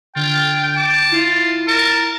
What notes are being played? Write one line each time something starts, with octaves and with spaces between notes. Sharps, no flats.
D3 F4 G5
A5 D6
E4 F4
A#4 A5